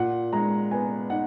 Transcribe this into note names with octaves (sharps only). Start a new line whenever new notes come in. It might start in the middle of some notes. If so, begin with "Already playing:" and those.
Already playing: A#2 F#5
G#3 A#5
B3 G#5
D#4 F#5